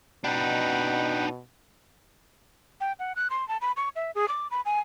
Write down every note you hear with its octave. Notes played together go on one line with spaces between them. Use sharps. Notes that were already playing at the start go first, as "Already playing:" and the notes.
B2 D4 D#4 F#5 G5 B5
G5
F#5
F#6
C6
A5
B5
C#6
E5
G#4
D6
B5
G#5